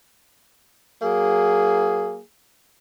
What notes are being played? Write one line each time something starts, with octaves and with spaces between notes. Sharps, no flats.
F#3 A#3 G#4